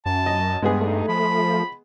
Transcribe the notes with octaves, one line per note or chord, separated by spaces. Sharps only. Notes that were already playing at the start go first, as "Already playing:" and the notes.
F#2 A5
D#5
G2 G#3 B3 G#4
A3 D#4
F3 B5